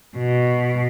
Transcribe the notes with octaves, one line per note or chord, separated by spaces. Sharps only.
B2